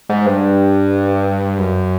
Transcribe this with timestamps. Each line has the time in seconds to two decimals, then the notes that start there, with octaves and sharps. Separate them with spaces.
0.09 G#2
0.26 G2
1.58 F#2